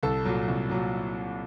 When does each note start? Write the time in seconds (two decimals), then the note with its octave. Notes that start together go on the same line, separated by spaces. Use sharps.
0.03 C2 A4
0.25 A#2 F#3
0.48 C2
0.70 A#2 F#3